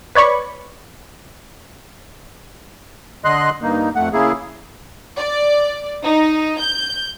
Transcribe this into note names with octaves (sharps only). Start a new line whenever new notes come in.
B4 C#5 D5 B5 C#6
D3 D#5 C6 F#6
G2 A#3 D#4
F2 A3 F#5
C#3 A#3 E4 G#4
D5
D#4
G6